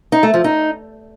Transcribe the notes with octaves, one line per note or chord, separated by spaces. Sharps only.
D#4
A3
F3
D#4